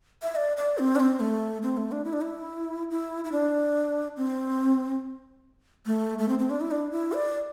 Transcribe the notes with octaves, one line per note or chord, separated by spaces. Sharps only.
E5
D5
D5
C4
D4
C4
A3
C4
A3
D4
E4
D4
E4
E4
E4
D4
C4
A3
A3
C4
C4
D4
E4
D4
E4
D5